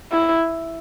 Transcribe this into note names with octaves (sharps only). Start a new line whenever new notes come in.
E4